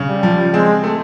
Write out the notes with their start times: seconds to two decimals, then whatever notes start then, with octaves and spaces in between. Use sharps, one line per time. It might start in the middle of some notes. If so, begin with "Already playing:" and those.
Already playing: C#3
0.08 G3
0.23 F3
0.53 G#3 C4
0.84 A3